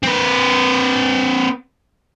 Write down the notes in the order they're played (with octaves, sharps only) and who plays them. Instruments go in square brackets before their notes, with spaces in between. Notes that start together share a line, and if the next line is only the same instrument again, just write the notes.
[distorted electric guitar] C4 B4